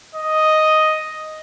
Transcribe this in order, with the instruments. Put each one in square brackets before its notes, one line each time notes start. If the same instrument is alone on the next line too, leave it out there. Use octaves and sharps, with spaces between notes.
[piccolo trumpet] D#5